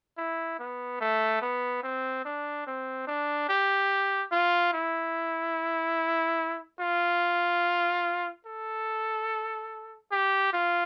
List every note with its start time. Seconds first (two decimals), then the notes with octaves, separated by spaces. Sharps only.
0.18 E4
0.59 B3
1.01 A3
1.42 B3
1.83 C4
2.25 D4
2.66 C4
3.07 D4
3.49 G4
4.32 F4
4.73 E4
6.80 F4
8.46 A4
10.12 G4
10.53 F4